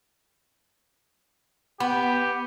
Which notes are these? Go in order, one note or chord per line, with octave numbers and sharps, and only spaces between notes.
B3 G4